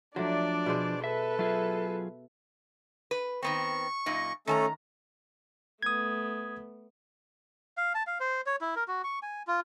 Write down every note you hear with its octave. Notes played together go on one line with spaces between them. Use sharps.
F3 F#3 A3 D4 D5
B2 G#4 C5
A4 B4 E5
F#3 F4 G#4 E5
B4
D#3 B3 C4 C#6
F#2 A#2 D#4
D#3 A3 C#4 A4 A5 A#5
A3 B3 D#6 G#6
F5
A5
F5
C5
C#5
E4
A#4
F#4
C#6
G#5
F4